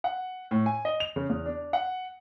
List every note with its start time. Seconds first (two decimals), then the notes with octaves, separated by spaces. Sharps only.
0.04 F#5
0.51 A2
0.66 G#5
0.85 D#5
1.00 F7
1.16 C#3
1.29 E2
1.46 D4
1.73 F#5